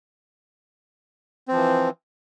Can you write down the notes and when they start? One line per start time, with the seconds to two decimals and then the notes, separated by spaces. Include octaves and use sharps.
1.48 C4
1.52 F3
1.56 E3